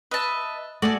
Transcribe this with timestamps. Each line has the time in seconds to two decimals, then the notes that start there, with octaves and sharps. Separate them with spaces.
0.11 B4 D#5 E5 A5
0.82 A3 F#4 G#4 A4 D5